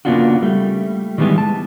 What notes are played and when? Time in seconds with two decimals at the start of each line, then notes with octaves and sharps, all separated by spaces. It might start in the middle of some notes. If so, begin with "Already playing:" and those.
0.05 C#3 A#3 B3 D4 F4 F#4
0.42 G3 A3
1.18 D#3 E3 G3 G#3 B3
1.38 A5